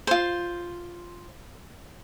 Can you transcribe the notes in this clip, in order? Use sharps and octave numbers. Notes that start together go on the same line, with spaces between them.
F4 C5